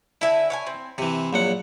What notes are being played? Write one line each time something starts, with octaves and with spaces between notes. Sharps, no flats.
D3 E4 E5 G#5
C#5 F5 G#5
C4
C3 E3 C5
A#1 F#3 F#5